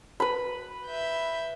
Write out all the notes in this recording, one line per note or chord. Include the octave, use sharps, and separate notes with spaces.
B4 B5
E5 G6